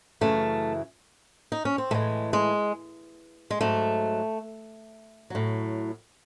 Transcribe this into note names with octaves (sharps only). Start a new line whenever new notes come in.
F#2 C#3 E3 A3
D#4
C#4
C4
A2 E3 G#3 A3
G#3
G#3
G#2 F#3 A3
A2 F#3